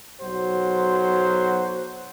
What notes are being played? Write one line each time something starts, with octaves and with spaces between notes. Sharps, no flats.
B1 F#3 F#4 C5